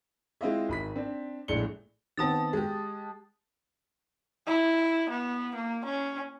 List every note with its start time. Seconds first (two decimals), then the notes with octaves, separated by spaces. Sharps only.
0.41 G#3 C4 E4 F4 D#5 E5
0.69 G#1 B5 B6
0.96 C4 D4
1.48 A#1 A2 G#3 D4 C#7 G7
2.17 D#3 B3 C4 A5 D#6 A6
2.53 G#3 G4
4.47 E4
5.10 B3
5.55 A#3
5.85 C#4